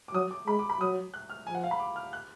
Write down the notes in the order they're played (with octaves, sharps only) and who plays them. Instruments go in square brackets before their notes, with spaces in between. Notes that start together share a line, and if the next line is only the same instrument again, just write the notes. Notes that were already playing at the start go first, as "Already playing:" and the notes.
[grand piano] D6
[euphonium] F#3 [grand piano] D#6
[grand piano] D6
[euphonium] G#3 [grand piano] B5
[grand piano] D6
B5
[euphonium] F#3 [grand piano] D#6
[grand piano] F#6
F6
[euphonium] F3 [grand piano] G#5
[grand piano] F#5
F5
B5
D6
F6
F#6